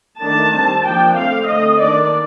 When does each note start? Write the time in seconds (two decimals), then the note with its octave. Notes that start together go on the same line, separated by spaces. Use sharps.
0.20 D#3 A3 D4 A5
0.52 G3 C4
0.84 F3 A#3 D4 G5
1.15 D3 A3 C4 F5
1.47 D3 A3 C4 D#5
1.79 D#3 A#3 D4 D5